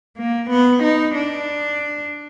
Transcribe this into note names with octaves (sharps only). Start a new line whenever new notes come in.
A#3
B3
D#4
D4